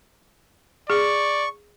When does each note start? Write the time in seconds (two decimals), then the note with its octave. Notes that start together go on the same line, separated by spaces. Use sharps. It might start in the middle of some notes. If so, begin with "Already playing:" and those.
0.90 G#4 D5 C#6